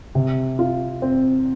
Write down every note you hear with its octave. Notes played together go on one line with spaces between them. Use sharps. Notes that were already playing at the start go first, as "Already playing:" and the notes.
C3
F4
C4